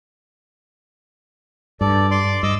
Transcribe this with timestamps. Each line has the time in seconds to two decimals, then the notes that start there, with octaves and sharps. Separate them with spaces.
1.81 G2 A4 D5
2.11 D5 C6 D6
2.43 G2 D#5 D6 E6